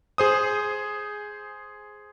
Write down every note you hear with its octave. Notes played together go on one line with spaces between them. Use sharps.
G#4 C5 D#6